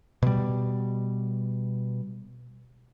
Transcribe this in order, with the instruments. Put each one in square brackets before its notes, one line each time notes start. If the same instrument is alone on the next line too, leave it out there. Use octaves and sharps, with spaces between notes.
[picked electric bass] B2 G3